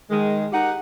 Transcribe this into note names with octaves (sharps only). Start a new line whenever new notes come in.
D#3 G#3
D#4 G4 A#4 F#5